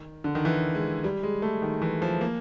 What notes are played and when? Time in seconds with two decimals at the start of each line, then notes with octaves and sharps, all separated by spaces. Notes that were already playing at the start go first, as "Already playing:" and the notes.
Already playing: D#3
0.24 D3
0.35 D#3
0.45 E3
0.75 G#3
1.04 G3
1.23 G#3
1.42 A3
1.62 D#3
1.82 E3
2.02 F3
2.21 A#3